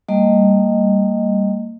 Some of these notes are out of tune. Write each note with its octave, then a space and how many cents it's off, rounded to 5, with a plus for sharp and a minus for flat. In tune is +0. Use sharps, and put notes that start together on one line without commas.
G3 +5 A#3 -25 D#5 +0